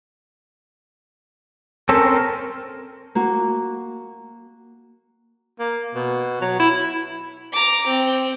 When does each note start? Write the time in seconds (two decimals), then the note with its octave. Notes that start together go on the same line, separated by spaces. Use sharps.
1.89 C4 C#4 A4 A#4
3.15 A#3 F#4
5.59 A#3
5.95 B2
6.41 F#3
6.60 E4
7.52 A#5 D6
7.86 C4